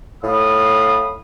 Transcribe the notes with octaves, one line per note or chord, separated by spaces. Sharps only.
A2 F5 B5 D#6